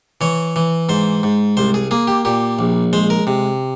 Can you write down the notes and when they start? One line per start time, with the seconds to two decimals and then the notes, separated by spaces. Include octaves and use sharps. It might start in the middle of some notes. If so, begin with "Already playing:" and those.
0.21 E3 C#5
0.56 E3
0.89 G#2 C5
1.23 G#2
1.57 C2 C5
1.74 G#4
1.91 A#3 G#4
2.07 G4
2.25 A#2 G4
2.59 A#1
2.93 G#3 C5
3.10 A#4
3.27 C3